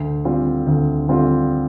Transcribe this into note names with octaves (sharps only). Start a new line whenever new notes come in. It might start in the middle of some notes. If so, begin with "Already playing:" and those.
Already playing: D2
D3 G3 C4 F4
D2
D3 G3 C4 F4